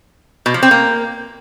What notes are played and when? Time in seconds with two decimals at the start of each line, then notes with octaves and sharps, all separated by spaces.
0.46 B2
0.54 F3
0.63 C4
0.71 A#3